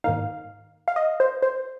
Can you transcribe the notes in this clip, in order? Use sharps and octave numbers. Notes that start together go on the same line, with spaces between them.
G#2 D#3 A#3 D#4 F5
F5
D#5
C5
C5